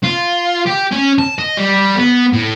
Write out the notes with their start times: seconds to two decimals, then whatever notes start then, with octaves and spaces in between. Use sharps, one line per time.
0.04 F4
0.66 G4
0.92 C#4
1.18 A5
1.39 D#5
1.58 G3
1.96 B3
2.33 A2